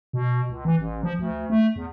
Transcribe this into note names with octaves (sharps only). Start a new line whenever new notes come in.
B2
C#2
E3
A1
F3
D2
A3
E2